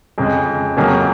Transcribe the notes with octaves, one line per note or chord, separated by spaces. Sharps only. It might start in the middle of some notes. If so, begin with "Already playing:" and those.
F2 C#3 G#3
F2 C#3 F#3 A#3 C#4